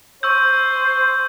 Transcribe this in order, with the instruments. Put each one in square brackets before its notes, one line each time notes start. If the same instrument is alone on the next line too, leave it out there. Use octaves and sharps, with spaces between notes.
[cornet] C5 [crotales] C#6 E6 G6